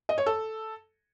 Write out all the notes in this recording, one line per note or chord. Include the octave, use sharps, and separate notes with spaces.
D#5
C#5
A4